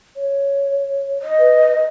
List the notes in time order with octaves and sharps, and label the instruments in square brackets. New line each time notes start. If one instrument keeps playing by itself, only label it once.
[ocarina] C#5
[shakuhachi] D#5
[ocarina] B4